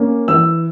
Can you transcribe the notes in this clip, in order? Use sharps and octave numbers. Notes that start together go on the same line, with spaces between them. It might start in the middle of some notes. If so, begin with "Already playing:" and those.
Already playing: A#3 C#4
E3 E6